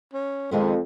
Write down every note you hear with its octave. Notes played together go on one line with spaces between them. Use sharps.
C#4
F2 D#3 G#3 B3 C4